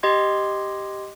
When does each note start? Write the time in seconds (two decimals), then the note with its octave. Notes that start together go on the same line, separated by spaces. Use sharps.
0.03 G4 D#5 C6 G#6